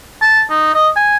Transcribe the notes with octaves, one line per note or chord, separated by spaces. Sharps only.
A5
D#4
D#5
G#5